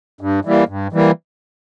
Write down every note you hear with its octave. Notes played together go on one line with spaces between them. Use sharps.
G2
E3 G3 A#3
G2
E3 G3 A#3